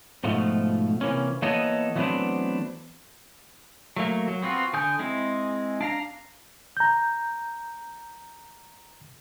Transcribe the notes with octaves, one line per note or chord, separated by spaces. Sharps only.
G#2 B2 F3 A3
C3 E3 A#3 C#4
E3 A#3 B3 A4 C#5 D#5
E3 F#3 A3 B3 C4 D4
F#3 A3 A#3
F#3
B3 C4 F4 F#4
D3 G#5 D#6 G6
G#3 C4 E4 G#4
D4 F5 A#5
A#5 G6